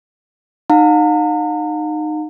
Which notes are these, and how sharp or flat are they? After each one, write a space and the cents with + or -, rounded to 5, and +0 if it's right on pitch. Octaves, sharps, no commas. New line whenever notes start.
D#4 -20 F5 +45 A#5 -40